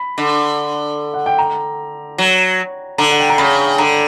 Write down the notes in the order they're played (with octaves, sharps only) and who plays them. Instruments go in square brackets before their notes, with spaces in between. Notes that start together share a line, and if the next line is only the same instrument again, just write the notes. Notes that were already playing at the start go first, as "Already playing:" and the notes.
Already playing: [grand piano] B5
[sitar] D3
[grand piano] F#5
G5
A#5
[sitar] F#3
[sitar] D3 [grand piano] A#5
[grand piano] F#5
G5
A#5
[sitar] C#3 [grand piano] B5
[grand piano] G5
[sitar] D3 [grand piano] A#5